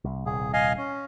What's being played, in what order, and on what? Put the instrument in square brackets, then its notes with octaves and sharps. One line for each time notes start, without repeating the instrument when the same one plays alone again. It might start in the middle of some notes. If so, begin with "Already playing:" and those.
[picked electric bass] C2
[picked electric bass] D#1 C2 [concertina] G#4
[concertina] D#5 F5 G#5
C#4